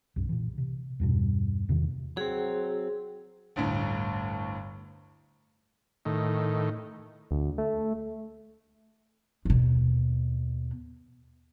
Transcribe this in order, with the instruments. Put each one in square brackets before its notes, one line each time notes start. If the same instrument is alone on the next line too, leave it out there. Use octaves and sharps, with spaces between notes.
[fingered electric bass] B1 F#2
A#2 E3
C3
E2 G2 B2
E2 C3 D#3
[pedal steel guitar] F#3 C4 [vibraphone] G#4
[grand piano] G1 D2 A2
[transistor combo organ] A2 D#3
[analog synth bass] D2
A3
[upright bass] D#2 B2